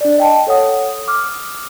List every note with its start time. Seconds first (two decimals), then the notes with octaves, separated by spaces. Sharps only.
0.01 D4 D5
0.18 D#5 G5 A5
0.47 A4 C#5 F#5 D#6
1.08 D6 D#6 F6